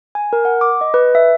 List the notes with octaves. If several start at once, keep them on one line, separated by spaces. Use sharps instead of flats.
G#5
A#4
F#5
D6
D#5
B4
E5